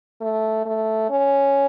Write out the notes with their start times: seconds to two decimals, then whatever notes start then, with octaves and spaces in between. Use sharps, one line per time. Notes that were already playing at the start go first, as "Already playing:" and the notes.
0.21 A3
0.66 A3
1.10 C#4